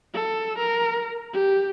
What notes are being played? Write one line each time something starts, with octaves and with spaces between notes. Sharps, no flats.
A4
A#4
G4